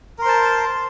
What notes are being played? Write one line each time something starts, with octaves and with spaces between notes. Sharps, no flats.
A#4 C5 A5 C6